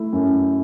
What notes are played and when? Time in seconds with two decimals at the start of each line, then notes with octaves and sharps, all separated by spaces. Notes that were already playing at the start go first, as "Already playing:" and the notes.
Already playing: A3 E4
0.13 F#2